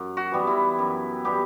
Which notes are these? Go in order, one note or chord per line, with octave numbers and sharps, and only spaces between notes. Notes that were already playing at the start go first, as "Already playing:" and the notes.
Already playing: F#2
F#4
E3 G3 B3
E4
F#2
E3 G3 B3 G4